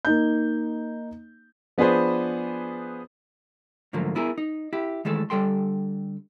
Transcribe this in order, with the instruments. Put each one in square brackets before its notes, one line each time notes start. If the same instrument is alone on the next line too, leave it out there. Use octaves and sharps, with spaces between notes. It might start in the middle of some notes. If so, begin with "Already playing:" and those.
[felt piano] A#3 D#4 G6
[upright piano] F3 B3 D4 G#4 B4 C5
[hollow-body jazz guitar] G#2 D3 F3 F#3 A3 A#3
B3 E4 G#4 A#4
D#4
E4 G4
D#3 E3 G#3 A3 A4
D3 G3 A4 G5 C6